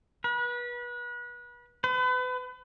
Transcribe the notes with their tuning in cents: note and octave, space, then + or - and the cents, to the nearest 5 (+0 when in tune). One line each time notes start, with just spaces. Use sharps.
B4 -30
B4 +35